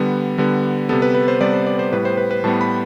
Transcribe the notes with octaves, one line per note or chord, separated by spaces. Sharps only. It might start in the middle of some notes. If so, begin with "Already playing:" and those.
Already playing: D3 G3 B3
D3 G3 B3
C3 G3 B3 A4
B4
B4
C5
C3 G3 B3 D5
C5
D5
C5
A2 G3 B3 B4
C5
B4
B4
A2 G3 B3 A5
B5